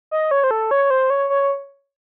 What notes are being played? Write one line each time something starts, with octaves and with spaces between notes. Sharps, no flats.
D#5
C#5
C5
A4
C#5
C5
C#5
C#5